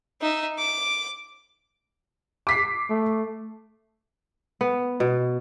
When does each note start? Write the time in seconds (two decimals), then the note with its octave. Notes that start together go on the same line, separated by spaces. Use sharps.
0.21 D#4 E5
0.58 D6
2.47 D6 B6 C7
2.90 A3
4.61 B3
5.00 B2